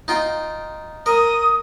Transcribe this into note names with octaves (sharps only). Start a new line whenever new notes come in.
D#4 F4 G5
A#4 D#6